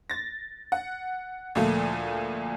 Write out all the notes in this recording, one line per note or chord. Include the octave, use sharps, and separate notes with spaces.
A6 A#6
F#5
D2 A#2 F3 A3